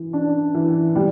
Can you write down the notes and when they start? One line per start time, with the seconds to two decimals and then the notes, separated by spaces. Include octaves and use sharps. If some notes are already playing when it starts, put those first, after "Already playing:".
Already playing: E3
0.13 D4
0.54 E3
0.96 G3